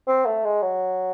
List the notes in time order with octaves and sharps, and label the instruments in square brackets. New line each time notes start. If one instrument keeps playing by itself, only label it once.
[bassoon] C4
A3
G#3
F#3